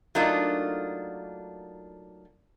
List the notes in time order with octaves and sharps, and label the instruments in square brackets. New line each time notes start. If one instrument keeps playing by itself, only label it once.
[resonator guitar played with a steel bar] F#3 A3 A#3 D4 D#4 F4